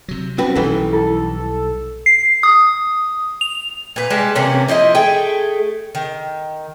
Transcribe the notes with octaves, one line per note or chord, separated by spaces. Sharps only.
C3 F#3
G3 C4 C#4 F#4 B4
B1 D#3 E3 G3 A4
E4 A4
C7
D#6
F7
A#2 B4
G3 G#3 A5
C3 E3 A#3 C#4
F3 E4 C5 D#5
A3 G#4 G5
D#3